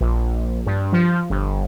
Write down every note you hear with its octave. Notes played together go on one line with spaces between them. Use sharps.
A#1
G2
F3
G1